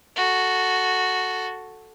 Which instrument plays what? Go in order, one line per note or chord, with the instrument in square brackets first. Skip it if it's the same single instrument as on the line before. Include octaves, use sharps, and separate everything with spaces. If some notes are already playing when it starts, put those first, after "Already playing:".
[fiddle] F#4 A4